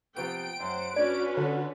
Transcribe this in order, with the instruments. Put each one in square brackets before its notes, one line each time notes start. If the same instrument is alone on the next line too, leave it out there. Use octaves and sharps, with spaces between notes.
[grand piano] C3 F3 B3 [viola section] G5 [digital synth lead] D7
[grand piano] F#2 [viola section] C5 F#5
[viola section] C#4 F#4 B4 [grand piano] D4 [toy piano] D5
[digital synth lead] D3